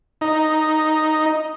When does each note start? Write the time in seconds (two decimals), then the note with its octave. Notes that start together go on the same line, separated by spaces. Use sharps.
0.21 D#4